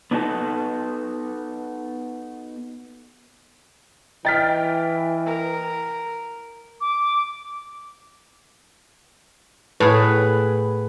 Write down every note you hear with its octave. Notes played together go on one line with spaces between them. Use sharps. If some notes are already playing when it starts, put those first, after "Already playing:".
B3 D4 D#4 F#4 A4 A5
E3 D#5 G5 F6 A6 B6
A#4
D6
A2 G#4 B4